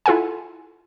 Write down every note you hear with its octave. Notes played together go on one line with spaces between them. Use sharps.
E4 F4 A4 F#5 G#5